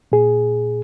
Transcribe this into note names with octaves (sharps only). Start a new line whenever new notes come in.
A#2 G#4